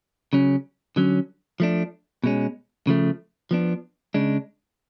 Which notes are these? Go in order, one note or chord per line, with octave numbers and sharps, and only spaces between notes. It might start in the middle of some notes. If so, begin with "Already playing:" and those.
C#3 F#3 C#4
D3 F#3 C#4
F3 A3 D4
B2 G#3 C#4
C#3 F3 A3
F3 B3 D4
C#3 G#3 D4